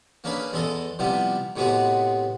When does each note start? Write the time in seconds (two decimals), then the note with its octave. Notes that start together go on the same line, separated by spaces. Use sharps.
0.24 A#3 C#4 D4 G#4 B4
0.52 E2 G#3 G#4 A4 D#5
0.99 C3 F3 G3 B3 E4
1.56 A2 C3 G#3 B3 F#4 G#4